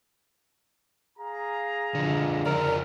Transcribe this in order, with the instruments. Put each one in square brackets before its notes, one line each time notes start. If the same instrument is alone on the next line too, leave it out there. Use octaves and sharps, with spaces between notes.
[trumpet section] G#4 F5 A#5
[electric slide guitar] D3 F3
[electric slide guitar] F2 C#3 D5 [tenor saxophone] A#4